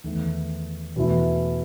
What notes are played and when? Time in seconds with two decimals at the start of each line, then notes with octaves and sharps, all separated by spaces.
0.04 E2 D#3 A3
0.96 E2 B2 A3 E4